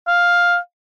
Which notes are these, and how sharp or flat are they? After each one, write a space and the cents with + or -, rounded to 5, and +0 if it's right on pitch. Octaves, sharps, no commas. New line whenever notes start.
F5 +5